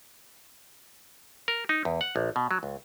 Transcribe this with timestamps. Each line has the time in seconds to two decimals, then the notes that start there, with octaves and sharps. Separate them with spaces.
1.48 A#4
1.69 D#4
1.85 E2
2.01 F#5
2.16 A#1
2.36 B2
2.51 F#3
2.63 C#2